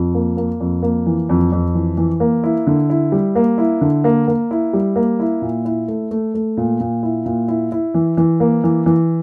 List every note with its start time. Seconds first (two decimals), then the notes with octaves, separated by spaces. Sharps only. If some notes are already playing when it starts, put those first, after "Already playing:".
Already playing: F2
0.15 A#3
0.37 A#3
0.60 F2
0.83 A#3
1.06 E3
1.29 F2
1.52 F2
1.75 E3
1.97 E3
2.20 A#3
2.44 E4
2.67 D3
2.90 E4
3.12 G3
3.35 A#3
3.58 E4
3.81 D3
4.04 A#3
4.28 A#3
4.51 E4
4.73 G3
4.96 A#3
5.19 E4
5.42 A#2
5.65 E4
5.88 A3
6.11 A3
6.34 A3
6.57 A#2
6.80 A#2
7.03 E4
7.26 A#2
7.48 E4
7.72 E4
7.94 E3
8.17 E3
8.40 A#3
8.64 E3
8.86 E3